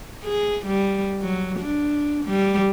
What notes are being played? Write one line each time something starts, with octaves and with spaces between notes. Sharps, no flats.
G#4
G3
F#3
D4
G3